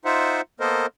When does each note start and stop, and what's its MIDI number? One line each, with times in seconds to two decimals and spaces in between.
0.05 0.41 63
0.05 0.41 65
0.05 0.41 72
0.05 0.41 76
0.05 0.41 78
0.60 0.86 58
0.60 0.86 59
0.60 0.86 69
0.60 0.86 70
0.60 0.86 72
0.60 0.86 75